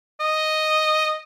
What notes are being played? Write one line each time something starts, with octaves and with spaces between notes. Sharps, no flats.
D#5